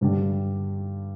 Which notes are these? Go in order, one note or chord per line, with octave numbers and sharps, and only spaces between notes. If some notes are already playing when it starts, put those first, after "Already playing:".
G2 D3 G3 D4 G4